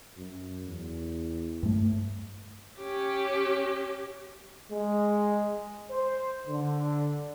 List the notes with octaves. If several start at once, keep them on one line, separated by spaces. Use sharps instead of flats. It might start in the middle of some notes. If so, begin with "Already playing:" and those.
F#2
E2
G2 A3
C#4 G4
G#3
C5
D3